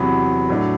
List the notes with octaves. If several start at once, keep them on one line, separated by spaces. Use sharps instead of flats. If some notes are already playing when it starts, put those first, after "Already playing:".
Already playing: E2 C3 F#3 B3
A2 F#3 A3 D4